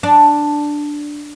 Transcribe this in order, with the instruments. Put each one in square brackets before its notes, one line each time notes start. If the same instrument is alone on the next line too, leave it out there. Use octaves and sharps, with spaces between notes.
[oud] D4